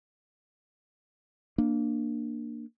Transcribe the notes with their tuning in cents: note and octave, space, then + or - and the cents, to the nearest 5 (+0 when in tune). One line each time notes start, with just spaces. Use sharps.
A#3 +0 D4 +15